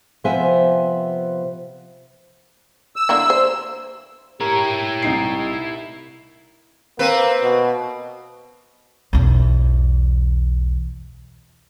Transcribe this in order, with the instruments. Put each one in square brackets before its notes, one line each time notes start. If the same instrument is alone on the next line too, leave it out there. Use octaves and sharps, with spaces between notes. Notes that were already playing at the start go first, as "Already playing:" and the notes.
[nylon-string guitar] C3 F3 B3 C5 E5 G#5
[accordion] E6
[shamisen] D3 A#3 E4
C5
[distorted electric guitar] E4 C#5 [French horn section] G4 [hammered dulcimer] A#4
[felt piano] C2 D#4 C7
[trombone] A#3 [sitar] C4 B4
[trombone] B2
[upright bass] B1 E2